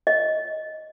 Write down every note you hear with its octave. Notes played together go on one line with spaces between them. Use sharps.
D#5